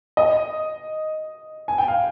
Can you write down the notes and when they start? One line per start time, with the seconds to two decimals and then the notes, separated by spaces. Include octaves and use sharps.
0.17 D#5
1.68 G#5
1.78 G5
1.88 F5